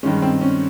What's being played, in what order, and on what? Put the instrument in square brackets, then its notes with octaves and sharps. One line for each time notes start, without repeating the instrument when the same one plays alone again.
[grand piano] G2 D#3 G#3 C#4
C4
C#4